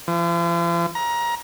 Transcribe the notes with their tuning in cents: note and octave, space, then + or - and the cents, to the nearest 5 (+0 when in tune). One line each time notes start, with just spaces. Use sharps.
F3 -45
A#5 +25